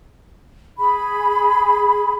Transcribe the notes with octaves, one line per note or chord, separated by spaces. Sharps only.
G#4 B5